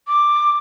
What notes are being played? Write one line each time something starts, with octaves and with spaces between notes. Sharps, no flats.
D6